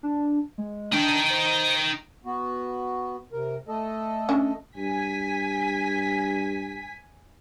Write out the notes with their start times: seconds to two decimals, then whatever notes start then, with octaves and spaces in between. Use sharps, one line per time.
0.03 D4
0.58 G#3
0.93 D4 D#4 G5
1.30 C5
2.25 B3 F#4
3.32 C3 A#4
3.68 A3 A4 D#5
4.29 C#4 D4
4.77 G2 G#5 B6